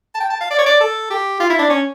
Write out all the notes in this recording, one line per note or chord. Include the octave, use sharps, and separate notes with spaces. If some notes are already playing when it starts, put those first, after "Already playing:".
A5
G5
A5
F5
D5
C#5
D5
A4
G4
F4
E4
D4
C#4